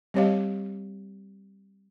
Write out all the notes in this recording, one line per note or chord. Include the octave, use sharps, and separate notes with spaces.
G3 C4 G4 C#5 D#5 F5